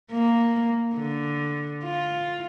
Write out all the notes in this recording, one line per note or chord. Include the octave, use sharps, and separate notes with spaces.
A#3
D3
F4